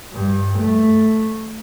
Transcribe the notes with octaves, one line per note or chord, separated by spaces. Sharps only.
G2
A3